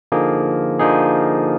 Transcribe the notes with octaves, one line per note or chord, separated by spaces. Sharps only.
D3 F3 A#3 D#4 G#4
D3 F3 A#3 D#4 G#4